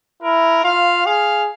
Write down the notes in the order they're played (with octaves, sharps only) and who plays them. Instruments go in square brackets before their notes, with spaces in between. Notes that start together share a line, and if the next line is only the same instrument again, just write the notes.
[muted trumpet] E4 [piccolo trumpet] A#4
[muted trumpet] F4 [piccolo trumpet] F5
[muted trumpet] G#4 [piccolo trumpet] F5